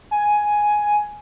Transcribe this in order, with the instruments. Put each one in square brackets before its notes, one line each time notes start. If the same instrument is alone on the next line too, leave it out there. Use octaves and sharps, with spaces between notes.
[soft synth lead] G#5